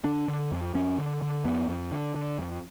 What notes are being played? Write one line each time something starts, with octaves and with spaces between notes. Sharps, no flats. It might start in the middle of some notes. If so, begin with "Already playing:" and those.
D3 D4
D3
F2
F2 C#4
D3
D3
F2 B3
F2
D3
D3
F2